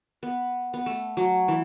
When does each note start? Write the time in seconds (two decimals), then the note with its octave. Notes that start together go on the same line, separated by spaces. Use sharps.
0.23 B3
0.74 B3
0.86 A3
1.17 F#3
1.48 E3